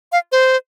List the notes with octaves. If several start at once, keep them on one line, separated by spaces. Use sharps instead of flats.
F5
C5